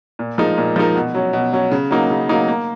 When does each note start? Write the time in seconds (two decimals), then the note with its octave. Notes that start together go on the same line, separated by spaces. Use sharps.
0.19 A#2
0.38 F3 G#3 D#4 A#4
0.58 A#2
0.76 F3 G#3 D#4 A#4
0.95 B2
1.15 F#3 C#4
1.33 B2
1.53 F#3 C#4
1.72 C#3
1.91 F#3 A#3 D#4
2.10 C#3
2.29 F#3 A#3 D#4
2.48 A#3